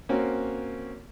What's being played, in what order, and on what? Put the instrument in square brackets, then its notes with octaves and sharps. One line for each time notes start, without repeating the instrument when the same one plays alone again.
[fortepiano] A#3 C4 C#4 F#4